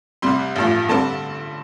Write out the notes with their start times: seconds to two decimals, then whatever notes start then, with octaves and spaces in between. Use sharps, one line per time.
0.22 C2 C3 G3 C6
0.56 A1 G2 F3
0.89 D3 G3 C4 A5